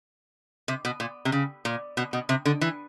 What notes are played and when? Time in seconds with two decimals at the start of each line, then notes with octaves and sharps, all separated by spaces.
0.68 C3
0.85 B2
1.00 A#2
1.25 C3
1.32 C#3
1.65 A#2
1.97 B2
2.13 B2
2.29 C3
2.45 D3
2.61 E3